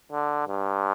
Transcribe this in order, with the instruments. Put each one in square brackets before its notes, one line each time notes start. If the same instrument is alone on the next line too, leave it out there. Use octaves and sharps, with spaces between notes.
[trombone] D3
G2